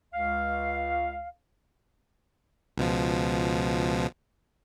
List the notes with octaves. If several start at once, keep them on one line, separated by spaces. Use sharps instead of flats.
C#2 F5
C#2 B2 F3